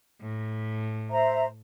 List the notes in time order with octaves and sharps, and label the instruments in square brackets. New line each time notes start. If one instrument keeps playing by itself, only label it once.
[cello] A2
[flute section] C5 E5 A#5